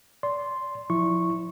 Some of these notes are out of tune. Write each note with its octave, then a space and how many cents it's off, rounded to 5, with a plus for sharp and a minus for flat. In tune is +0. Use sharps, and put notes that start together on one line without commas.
D5 -25 C6 +0
F3 +20 E4 +0 C#6 -10